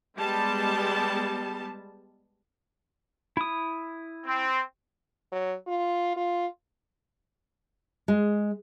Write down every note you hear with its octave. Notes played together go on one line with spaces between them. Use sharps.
G3 G#3 B3 A5
E4 D#6
C4
F#3
F4
F4
G#3